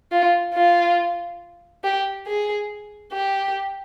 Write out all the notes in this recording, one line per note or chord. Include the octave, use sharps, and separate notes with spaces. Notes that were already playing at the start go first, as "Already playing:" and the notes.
F4
F4
G4
G#4
G4